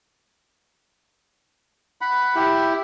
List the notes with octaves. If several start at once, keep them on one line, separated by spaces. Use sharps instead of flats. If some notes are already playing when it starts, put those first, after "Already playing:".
F#5 B5
E4 G4